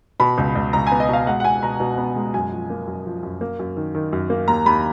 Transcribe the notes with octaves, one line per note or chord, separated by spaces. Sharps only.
B2 B5
C#2
C#2
C#2 A#5
G#5
B3
D#5
B2 F5
G#3 F#5
F#5
B2 G#5
B2 A#5
B2
B3
G#3
F#2 G#5
F3
A#3
F#2
F3
F#2
A#3
F#2
D#3
D#3
F#2
A#3
D#2 A#5
D#2 B5